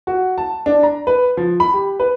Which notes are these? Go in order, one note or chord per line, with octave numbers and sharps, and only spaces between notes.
F#4
A5
D4
A#5
B4
F3
B5
G4
B4